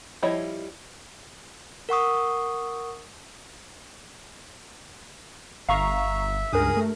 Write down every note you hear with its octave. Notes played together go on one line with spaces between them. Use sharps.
F3 G3 E4 C#5 D#5
A#4 F#5 C#6 D#6
G1 E5 F5 A#5 C#6
C#2 G2 G#4 A#4 D#6
A3